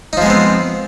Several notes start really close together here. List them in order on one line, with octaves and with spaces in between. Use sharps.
D#4 F3 G#3 B3 C4